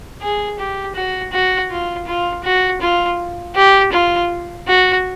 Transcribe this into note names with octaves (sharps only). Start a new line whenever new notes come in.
G#4
G4
F#4
F#4
F4
F4
F#4
F4
G4
F4
F#4